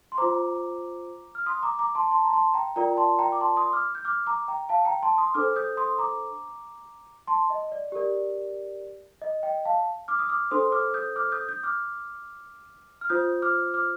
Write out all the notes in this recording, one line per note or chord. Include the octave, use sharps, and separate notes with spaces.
C6
F4 C5 A#5 D6
F6
C6 D#6
A#5 D6
A#5 D6
A5 C6
A5 C6
A#5
A5 C6
G5 A#5
F4 A#4 D5 G5 A#5
A5 C6
G5 A#5
D6
A5 C6
C6 D#6
D6 F6
G6
D6 F6
A#5 D6
G5 A#5
F5 A5
G5 A#5
A5 C6
C6 D#6
D4 A4 C5 D6 F6
D#6 G6
C6 D#6
A#5 D6
A5 C6
D#5
D5
G4 A#4 D5
D#5
D#5 G5
F5 A5
D6 F6
D#6
D6 F6
D4 A4 C5 C6 D#6
D6 F6
D#6 G6
D6 F6
D#6 G6
D#6 G6
D6 F6
F6
F4 C5 D#6 G6
D6 F6
D6 F6